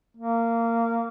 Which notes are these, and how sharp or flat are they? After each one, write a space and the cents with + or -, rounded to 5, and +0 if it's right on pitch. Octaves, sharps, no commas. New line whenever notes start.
A#3 -15